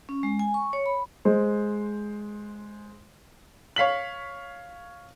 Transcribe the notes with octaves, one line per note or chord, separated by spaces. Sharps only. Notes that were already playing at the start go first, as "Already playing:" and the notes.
C#4
G#3
G#5
C#6
C#5
B5
G#3 C5
C#5 F5 B6 F#7